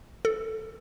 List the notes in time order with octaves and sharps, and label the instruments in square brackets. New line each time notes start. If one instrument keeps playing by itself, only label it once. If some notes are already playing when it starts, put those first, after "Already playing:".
[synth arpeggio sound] A4